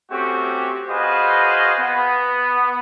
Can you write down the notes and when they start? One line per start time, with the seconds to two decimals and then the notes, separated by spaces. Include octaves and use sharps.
0.11 A3 C4 C#4 F#4 G4
0.88 F#4 G#4 B4 C5 D#5 F5
1.79 B3